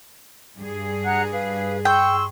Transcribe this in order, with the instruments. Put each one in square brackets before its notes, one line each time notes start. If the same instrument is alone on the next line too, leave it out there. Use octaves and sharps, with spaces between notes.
[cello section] G2 G#4
[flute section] F#5 A#5 F#6
B4 F5
[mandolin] G5 [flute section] C6 C#6 E6